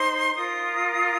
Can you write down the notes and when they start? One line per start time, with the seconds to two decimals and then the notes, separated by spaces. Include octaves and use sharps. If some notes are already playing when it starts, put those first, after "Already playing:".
Already playing: D#4 C5 C6
0.35 F4 A#4 D#6